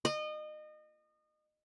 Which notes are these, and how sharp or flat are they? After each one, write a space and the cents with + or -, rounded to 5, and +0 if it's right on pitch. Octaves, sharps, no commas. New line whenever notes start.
D#5 -30